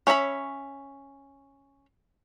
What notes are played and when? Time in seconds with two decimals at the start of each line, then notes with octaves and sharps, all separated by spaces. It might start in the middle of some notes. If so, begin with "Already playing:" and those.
0.07 C#4 C#5 E5 A#5 B5